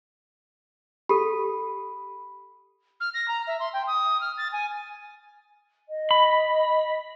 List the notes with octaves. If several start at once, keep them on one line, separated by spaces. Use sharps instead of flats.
G4 A4 B5
F6
A#6
A#5
E5
C6
G5
D#6
F6
A6
G#5
D#5
B5